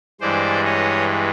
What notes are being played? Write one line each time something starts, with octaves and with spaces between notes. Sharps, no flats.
G2 E3 G#3 C5 D5
C#5 D#5